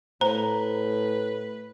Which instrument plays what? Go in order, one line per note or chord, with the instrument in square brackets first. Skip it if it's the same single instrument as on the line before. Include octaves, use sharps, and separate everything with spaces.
[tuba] A2 [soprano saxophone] B4 [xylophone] C5 [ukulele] A#5